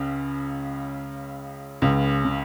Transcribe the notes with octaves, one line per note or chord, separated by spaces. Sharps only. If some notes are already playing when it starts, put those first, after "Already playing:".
Already playing: C#2 C#3
C#2 C#3
C#3